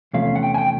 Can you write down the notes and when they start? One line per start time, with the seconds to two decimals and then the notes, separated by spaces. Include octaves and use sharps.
0.14 E2 C3 F3 A3 C#4 F5
0.36 F#5
0.43 G5
0.54 G#5
0.58 G5